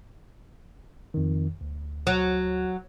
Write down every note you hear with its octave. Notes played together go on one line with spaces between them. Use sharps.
F2 D#3
D2
F#3